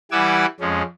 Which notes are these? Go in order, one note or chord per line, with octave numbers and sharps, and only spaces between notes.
E3 G3 F#5 G#5 D6 E6
F2 G#3 C#4